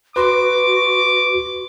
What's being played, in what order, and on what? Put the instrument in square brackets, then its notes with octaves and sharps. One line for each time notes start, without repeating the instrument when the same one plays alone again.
[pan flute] F#4 [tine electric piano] B4 C6 [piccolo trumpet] D6